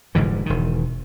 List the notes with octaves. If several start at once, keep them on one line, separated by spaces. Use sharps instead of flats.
F1 G#2 D3 E3
E1 D#3